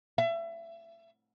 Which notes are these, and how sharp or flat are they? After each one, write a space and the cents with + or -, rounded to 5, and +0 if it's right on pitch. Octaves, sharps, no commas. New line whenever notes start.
E5 +25